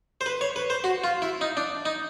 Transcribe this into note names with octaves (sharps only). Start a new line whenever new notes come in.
C5
B4
C#5
B4
C5
F#4
F4
E4
D#4
D4
D#4